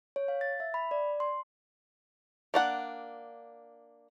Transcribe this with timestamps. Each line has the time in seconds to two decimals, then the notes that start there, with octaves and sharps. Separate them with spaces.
0.16 C#5
0.28 F5
0.41 A6
0.60 E5
0.74 B5
0.91 D5
1.20 C6
2.54 A#3 D4 F#5